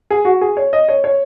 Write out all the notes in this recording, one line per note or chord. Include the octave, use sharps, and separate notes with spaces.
G#4
F#4
G#4
C#5
D#5
C#5
C#5